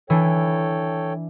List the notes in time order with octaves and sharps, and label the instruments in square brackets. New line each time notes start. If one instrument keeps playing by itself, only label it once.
[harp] E3 D4 [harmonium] A4 C#5 G5